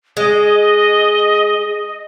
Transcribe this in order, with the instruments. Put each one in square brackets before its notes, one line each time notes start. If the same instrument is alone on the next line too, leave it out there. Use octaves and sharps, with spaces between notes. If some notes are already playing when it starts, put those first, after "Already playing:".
[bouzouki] G#3 [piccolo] D#5